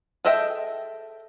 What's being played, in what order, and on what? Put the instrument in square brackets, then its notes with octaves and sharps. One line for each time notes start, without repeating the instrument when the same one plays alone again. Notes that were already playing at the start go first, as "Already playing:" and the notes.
[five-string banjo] G#4 A4 D#5 E5 G5